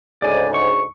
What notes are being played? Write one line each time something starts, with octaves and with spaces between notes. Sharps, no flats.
D2 G#2 C#3 D5 G#5
C#6